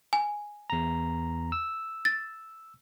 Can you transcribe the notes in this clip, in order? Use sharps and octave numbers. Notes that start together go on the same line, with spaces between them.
G#5
E2 A#5
E6
A6